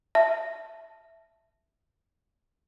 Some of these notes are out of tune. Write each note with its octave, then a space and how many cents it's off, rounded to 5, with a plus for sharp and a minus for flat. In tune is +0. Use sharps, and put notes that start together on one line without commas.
E5 +0 A5 +0